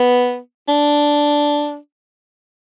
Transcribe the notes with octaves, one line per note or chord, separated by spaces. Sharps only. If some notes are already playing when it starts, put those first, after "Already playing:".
Already playing: B3
D4